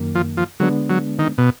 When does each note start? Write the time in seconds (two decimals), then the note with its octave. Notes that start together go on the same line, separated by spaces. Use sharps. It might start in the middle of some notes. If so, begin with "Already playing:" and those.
Already playing: F#2 D#3 A#3
0.15 F3
0.37 F3
0.60 D3 F#3 G#3 B3 D4
0.90 F#3
1.19 D#3
1.38 B2